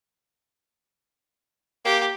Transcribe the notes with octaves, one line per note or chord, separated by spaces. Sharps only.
A#3 G4